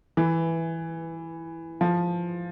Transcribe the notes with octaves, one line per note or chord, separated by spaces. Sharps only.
E3
F3